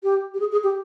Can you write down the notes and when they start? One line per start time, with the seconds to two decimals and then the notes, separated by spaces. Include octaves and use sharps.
0.03 G4
0.34 G4
0.40 G#4
0.52 G#4
0.64 G4